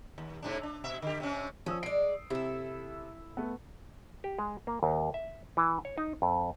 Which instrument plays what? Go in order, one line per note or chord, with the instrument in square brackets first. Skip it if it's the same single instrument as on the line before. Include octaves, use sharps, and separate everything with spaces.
[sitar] D#2
G#2 C3 D4
D4
B2 E5
D3 G4
C3 C4 C#4
[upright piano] F3 D#6 E6 [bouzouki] C#4
[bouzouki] G#3 D5 [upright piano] C7 D7
[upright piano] C3 [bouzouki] E4 A4
[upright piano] A3 B3
[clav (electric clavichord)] G4
G#3
A#3
D#2
E5
E3
C#5
D#4
F2